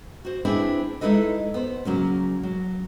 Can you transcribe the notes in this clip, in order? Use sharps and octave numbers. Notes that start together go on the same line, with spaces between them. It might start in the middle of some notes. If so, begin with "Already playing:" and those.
F#4 C5
C4 D4 E4 G#4 B4 C5
G#3 D#4 E4 A4 B4 D#5
B3 C5
C#3 F#3 A#3 C#4
F#3